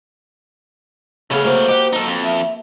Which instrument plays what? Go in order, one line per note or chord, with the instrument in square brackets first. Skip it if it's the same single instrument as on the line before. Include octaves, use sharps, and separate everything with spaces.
[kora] C#3 B3 [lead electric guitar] A3 F5 [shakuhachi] G#4
[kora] A#3 B3 F#4 [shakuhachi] C5
[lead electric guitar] G4 [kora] D#5 F#5
[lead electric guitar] D#4 A4
F2
[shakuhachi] E5